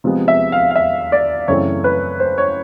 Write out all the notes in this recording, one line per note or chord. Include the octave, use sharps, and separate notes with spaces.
C3 F3 G#3 B3
E5
F5
F5
E5
D5
F#2 C#3 E3 A3 C4 C#5
B4
C5
C#5